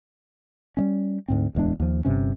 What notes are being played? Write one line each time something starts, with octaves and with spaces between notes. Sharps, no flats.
G3 G#3 C#4
D2 G#2 C4
D1 E2 G#3 D4
D#2 F3
G1 G2 C3 C#4